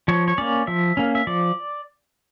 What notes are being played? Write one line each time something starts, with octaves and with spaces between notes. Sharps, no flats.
F3 C#5
C#5
A#3 C#4 D5
F3 E5
A#3 C#4
E5
F3 D5